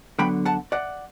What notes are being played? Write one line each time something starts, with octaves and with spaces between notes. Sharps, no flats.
D3 F#3 B3 G5 B5
F#5 A5
D5 F#5